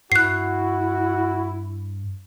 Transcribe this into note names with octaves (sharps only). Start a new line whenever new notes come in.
G2 E4 F#4 F#6 C7